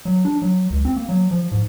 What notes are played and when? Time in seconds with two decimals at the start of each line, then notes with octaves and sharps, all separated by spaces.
0.05 F#3
0.25 D4
0.42 F#3
0.70 C#2
0.85 C4
0.96 A#3
1.09 F#3
1.31 F3
1.52 G#2